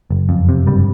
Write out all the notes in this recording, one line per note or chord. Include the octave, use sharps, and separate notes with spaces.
F#1
F2
C3
F#1 G2 G3